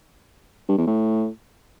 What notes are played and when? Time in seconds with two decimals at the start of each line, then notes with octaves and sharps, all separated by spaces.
0.68 G2
0.78 E2
0.87 A2